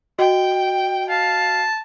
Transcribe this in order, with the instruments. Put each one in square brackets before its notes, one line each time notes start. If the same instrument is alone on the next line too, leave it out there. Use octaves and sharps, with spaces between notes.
[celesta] F#4 D#5 [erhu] G5
[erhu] F5 [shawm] A5